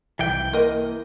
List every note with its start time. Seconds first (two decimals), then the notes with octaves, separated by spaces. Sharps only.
0.19 C2 E3 G5
0.53 A#3 A#4 D#5